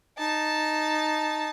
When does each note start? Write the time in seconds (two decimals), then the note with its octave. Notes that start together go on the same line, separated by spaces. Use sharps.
0.18 D#4 A5